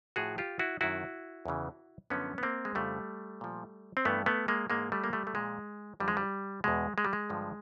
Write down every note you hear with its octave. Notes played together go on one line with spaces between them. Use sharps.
A2 F3 F#4 G#4
F4 G4
E4 F#4
F#2 D#3 E4 F#4
E2 C#3 E3
F#2 D3 F3 B3 C#4
B3
A#3 C4
G#3
F2 C#3 F3 G3 A3
A#2 F3
C4
G2 E3 A3 B3
A3 B3
G#3 A#3
G#2 E3 G#3 A#3
G3 A3
A#3
G3 A3
A3
A#2 F3 G#3
F2 D3 F3 G3
G#3
G3
E2 B2 G#3
G#3
G3
G#3
G2 D3 F3